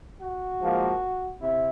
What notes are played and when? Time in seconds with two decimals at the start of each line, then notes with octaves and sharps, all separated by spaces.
0.21 F#4
0.61 G#2 F3 A#3
1.41 C3 E4